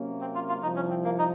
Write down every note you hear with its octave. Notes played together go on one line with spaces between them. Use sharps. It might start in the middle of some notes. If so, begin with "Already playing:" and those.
Already playing: C3 F#3 A#3 C#4
C4
F4
F4
C2 C3 F3 D#4
C#4
C4
A#3
D#4